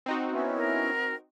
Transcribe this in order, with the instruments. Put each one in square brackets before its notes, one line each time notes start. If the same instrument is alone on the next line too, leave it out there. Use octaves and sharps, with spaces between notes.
[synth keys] C4 D#4 F#4
[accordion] B3 C#4 E4
[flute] A#4